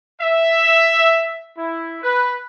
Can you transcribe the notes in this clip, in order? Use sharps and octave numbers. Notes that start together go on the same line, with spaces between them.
E5
E4
B4